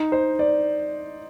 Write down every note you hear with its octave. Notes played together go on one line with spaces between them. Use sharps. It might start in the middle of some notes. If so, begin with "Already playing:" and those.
Already playing: D#4
C5
D5